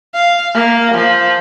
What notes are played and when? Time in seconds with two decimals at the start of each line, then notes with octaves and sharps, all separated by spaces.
0.14 F5
0.54 A#3
0.94 F3